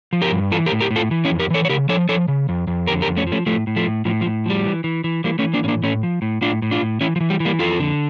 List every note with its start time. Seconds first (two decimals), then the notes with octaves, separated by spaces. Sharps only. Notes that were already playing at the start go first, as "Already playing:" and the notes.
0.13 F3
0.22 G4 A#4
0.32 G2
0.52 E3 F4 A4
0.66 G4 A#4
0.72 A2
0.81 G4 A#4
0.91 A2
0.96 F4 A4
1.11 E3
1.25 C#4 E4
1.30 F2
1.39 G4 A#4
1.50 E3 A4 C#5
1.65 C#5
1.69 C#3 G4 A#4
1.89 F3 A4 C#5
2.09 F3 A4 C#5
2.28 C#3
2.49 F2
2.67 F2
2.87 D3 G4 A#4
3.02 G4 A#4
3.07 F2
3.17 A3 C#4
3.27 F3
3.32 A3 C#4
3.46 A2 F3 A3
3.67 A2
3.76 F3 A3
3.87 A2
4.05 A2 F3
4.21 F3
4.26 A2
4.46 F3 G3
4.66 E3
4.84 E3
5.04 E3
5.24 E3 G3 A#3
5.39 A3 C#4
5.44 E3
5.53 A#3 D4
5.63 A2 C#4
5.68 A#3 D4
5.83 A2 A3 C#4
6.03 F3
6.22 A2
6.42 A2 D4 F4
6.62 A2
6.71 D4 F4
6.81 A2
7.01 E3 C#4 E4
7.16 F3
7.21 E3
7.30 G3
7.40 E3
7.45 G3 A#3
7.59 F2 F4 A4
7.80 D3